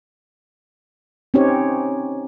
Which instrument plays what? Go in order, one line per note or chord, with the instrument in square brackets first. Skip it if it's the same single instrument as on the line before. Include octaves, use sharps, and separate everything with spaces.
[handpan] C4 C#4 D#4 G4 C#5